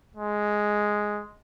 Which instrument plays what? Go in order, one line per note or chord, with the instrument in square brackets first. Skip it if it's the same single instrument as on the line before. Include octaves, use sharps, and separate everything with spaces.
[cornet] G#3